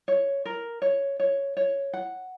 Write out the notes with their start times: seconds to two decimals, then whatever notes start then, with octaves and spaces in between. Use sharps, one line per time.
0.08 C#5
0.45 A#4
0.82 C#5
1.20 C#5
1.57 C#5
1.93 F#5